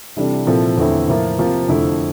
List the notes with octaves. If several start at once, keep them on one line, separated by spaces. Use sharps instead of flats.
C3 E3 G3 D4 A4
A#2 F3 C4 E4 A4
E2 D3 A3 C4 E4
A2 F3 A#3 F4
C3 F3 A#3 F4
F2 D3 A3 E4